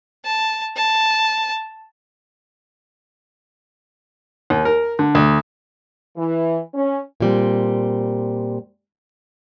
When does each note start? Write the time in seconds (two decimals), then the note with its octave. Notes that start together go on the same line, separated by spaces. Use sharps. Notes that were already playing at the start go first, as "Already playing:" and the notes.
0.25 A5
0.76 A5
4.50 D#2
4.65 A#4
4.99 D3
5.15 D2
6.17 E3
6.74 C#4
7.20 A#2 G3 C4